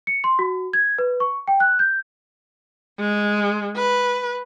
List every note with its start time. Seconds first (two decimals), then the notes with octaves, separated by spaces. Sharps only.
0.07 C#7
0.24 C6
0.39 F#4
0.73 G#6
0.98 B4
1.20 C#6
1.48 G5
1.60 F#6
1.79 G6
3.00 G#3
3.77 B4